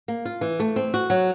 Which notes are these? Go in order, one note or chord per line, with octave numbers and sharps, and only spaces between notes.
A#3
F4
E3
A3
C4
F#4
F#3